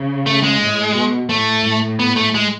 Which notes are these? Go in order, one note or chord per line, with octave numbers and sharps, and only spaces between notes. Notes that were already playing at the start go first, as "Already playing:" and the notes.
Already playing: C#3
A3
G#3
A2
B2
A2 A3
A2
B3
A3
G#3